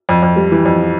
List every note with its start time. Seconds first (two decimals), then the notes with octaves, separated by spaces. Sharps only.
0.09 F2
0.22 F2
0.36 G3
0.52 E3
0.65 F2